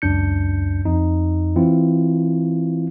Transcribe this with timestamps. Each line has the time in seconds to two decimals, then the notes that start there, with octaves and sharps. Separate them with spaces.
0.02 C#2 F#2 D4 G6 C#7
0.85 F2 D#4
1.56 E3 C4 E4 F4